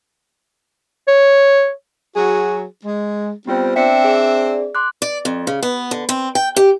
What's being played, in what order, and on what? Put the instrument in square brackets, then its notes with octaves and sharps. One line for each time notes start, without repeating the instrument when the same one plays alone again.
[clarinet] C#5
[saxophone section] F#3 F#4 G#4
G#3
[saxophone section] G3 C4 [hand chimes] B3 F4 C5
[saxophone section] C4 D4 E5 [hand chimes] G5 B6 C#7
[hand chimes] G#4 D5
C6 D6 F#6
[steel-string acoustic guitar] D5
F2
C#3
B3
D3
C4
G5
G4